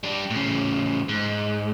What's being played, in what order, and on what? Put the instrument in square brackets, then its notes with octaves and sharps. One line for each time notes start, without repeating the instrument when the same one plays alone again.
[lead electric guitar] G3 D4
A2 C#3
G#2